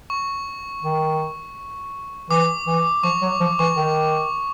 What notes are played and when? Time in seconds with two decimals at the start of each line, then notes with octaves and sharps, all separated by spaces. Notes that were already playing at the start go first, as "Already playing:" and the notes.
0.10 C#6
0.83 D#3
2.30 E3 D6
2.67 E3
3.03 F3 C#6
3.22 F#3
3.40 F3
3.59 E3 C#6
3.77 D#3